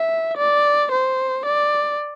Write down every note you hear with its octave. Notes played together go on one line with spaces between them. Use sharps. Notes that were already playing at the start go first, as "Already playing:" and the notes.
Already playing: E5
D5
C5
D5